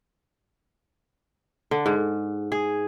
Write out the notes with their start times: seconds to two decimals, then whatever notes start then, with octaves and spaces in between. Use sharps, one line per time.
1.71 D3
1.86 G#2
2.52 G#4